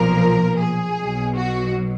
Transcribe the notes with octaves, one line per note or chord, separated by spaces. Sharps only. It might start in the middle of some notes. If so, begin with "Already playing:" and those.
Already playing: B1 A#2 F3 A#4
G#4
B1 B2 F#3
F#4